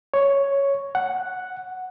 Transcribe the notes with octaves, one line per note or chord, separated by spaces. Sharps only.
C#5
F#5